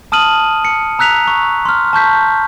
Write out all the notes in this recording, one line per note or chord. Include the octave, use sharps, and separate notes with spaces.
A5 D#6 F6 D#7 F#7
C#7
A#5 E6 F#6 B6 F7
C#6
C6 F6
A5 C#6 G6 B6